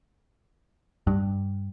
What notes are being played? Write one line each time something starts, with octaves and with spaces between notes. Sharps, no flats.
G2